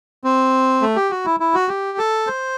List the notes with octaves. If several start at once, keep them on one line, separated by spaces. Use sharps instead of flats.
C4
A3
G4
F#4
E4
E4
F#4
G4
A4
C5